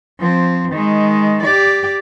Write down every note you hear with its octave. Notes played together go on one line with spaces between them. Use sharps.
F3 C4
D#3 G#3
G4 D5